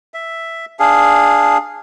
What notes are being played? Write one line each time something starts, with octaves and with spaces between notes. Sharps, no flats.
E5
D4 G#4 F5